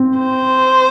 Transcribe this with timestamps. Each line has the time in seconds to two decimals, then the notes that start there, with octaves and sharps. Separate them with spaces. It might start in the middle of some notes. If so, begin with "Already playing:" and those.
Already playing: C4
0.18 C5